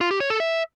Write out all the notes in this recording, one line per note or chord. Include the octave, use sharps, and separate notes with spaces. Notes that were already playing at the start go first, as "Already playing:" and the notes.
F4
G4
C#5
A4
E5